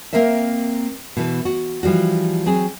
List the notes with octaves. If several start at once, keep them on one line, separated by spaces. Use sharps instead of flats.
A#3 C4 A#4 C5 E5
B2 E3
F#4
E3 F3 G3 F#4
F#3 C4 G#4